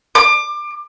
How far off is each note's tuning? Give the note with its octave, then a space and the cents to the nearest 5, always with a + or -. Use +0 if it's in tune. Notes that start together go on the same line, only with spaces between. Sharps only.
D6 +25